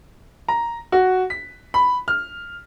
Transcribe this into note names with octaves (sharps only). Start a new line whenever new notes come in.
A#5
F#4
B6
B5
F6